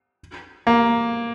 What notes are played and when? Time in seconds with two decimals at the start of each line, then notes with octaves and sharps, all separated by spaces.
0.67 A#3